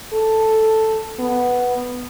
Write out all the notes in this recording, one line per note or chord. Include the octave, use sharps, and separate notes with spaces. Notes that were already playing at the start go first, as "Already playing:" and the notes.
A4
B3